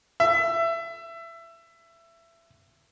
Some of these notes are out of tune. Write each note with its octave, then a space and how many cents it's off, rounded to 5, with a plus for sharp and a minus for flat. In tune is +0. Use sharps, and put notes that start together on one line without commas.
E5 +20